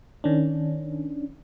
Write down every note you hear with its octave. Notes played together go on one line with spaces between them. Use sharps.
D#3 C#4 D4